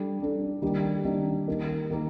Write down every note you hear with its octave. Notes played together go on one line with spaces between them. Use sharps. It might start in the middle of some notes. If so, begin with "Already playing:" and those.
Already playing: G3 D4 A4
G3 D4 A4
D#3 G3 A#3 D4 G4
D#3 G3 A#3 D4 G4
D#3 A#3 D#4 G4 A#4
D#3 A#3 D#4 G4 A#4